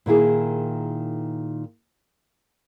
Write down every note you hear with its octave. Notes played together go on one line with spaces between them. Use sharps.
A#2 D#3 E4 G#4